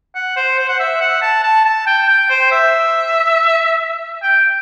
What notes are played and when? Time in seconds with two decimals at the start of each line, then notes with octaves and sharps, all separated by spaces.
0.15 F#5
0.37 C5
0.58 C5
0.69 F#5
0.80 E5
1.00 F#5
1.22 A5
1.44 A5
1.65 A5
1.87 G5
2.08 G5
2.30 C5
2.51 E5
4.23 G5